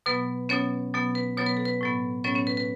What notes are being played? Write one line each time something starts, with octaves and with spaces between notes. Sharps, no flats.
B2 F#3 B3 B4
B2 F#3 B3 C#4 C#5
B2 F#3 B3
B4
B2 F#3 B3 C#5
B4
A4
B4
A2 F#3 B3
A2 F#3 B3 C#4 C#5
C#4 C#5
B4
B4